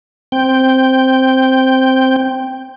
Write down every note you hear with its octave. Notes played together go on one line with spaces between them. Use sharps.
C4 G5